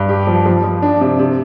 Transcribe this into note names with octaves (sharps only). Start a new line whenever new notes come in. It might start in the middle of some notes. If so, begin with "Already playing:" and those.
Already playing: G2
G4
F3
F3
F3
D4
C3
C3